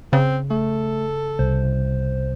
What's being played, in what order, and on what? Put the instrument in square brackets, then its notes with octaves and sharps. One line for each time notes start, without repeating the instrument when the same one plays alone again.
[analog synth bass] C#3 [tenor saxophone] C4
[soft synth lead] A3 [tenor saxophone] A4
[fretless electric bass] C2 [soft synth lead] C5